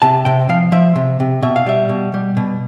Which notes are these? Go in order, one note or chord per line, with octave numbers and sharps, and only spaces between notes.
C3 A5
C3 G5
F3 F5
F3 E5
C3
C3
B2 E5
F5
G3 E5
B2
G3
B2